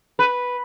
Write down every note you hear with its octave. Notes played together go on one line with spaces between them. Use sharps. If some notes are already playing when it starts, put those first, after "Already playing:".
B4